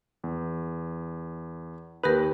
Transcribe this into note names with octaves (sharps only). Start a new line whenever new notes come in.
E2
D#2 D#4 G4 A#4 B4